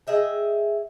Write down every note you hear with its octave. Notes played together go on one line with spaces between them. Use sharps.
G#4 D#5 E5 G5